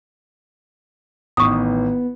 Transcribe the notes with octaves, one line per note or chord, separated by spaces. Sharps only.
A1 D#3 B3 C#6 D#6